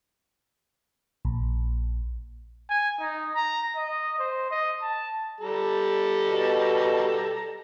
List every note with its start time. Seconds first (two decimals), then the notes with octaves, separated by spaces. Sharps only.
1.25 A#1
2.70 G#5
3.00 D#4
3.35 A#5
3.76 D#5
4.19 C5
4.51 D#5
4.82 A5
5.40 G3 A4 A#5
6.29 B2